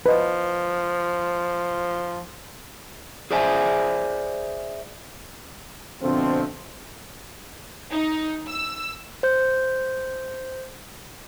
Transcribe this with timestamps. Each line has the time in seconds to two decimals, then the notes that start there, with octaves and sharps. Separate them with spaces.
0.06 F3 B4 D#5
3.31 G#4 C5 D5 E5 G#5
6.02 F2 B2 D3 F3 A3 C4
7.90 D#4
8.48 E6
9.23 C5 G6